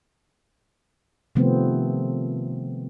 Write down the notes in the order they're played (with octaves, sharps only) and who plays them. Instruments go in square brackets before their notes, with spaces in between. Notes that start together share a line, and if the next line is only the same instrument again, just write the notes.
[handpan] C3 D#3 F3 A3 B3 C4